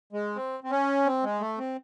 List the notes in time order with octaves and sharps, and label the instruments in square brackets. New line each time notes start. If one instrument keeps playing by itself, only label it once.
[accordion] G#3
C4
C4
C#4
C4
G#3
A3
C4